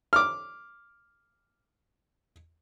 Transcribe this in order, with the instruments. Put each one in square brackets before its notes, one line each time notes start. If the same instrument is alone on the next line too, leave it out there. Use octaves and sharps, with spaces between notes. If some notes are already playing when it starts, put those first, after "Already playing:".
[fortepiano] D6 F6